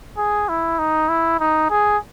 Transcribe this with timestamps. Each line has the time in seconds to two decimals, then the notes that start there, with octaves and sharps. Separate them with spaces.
0.18 G#4
0.49 E4
0.79 D#4
1.09 E4
1.40 D#4
1.70 G#4